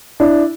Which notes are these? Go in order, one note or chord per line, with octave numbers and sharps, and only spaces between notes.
D4 E4